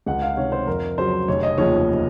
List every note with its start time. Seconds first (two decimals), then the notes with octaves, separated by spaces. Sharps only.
0.06 C#2 F#5
0.22 F5
0.37 C3 D#3 C#5
0.52 C5
0.67 F2 A#4
0.97 C#3 F#3 C5
1.28 F1 C#5
1.43 D#5
1.58 D#2 C#3 F3 C#5